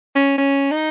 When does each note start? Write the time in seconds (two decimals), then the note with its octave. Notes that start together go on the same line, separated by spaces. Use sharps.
0.15 C#4
0.38 C#4
0.71 D#4